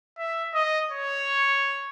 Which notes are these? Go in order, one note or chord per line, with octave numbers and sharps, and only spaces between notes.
E5
D#5
C#5